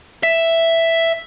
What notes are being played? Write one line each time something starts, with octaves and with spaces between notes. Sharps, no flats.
E5